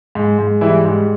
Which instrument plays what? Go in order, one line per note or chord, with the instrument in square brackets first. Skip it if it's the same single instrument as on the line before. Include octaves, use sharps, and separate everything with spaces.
[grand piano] G#2
G#2
E3 G3 E4
G#2